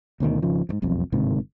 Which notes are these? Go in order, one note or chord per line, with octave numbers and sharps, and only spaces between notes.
D2 B2 D3 D#3
G#1 C#3 F3
F2 G#2
E1 B1 F2
G1 G#2 C3 D#3